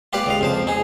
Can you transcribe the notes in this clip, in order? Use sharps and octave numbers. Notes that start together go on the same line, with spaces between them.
F4 G4 B4 D5
C#2 D#5 F5
F2 C5 A5
D#4 G#4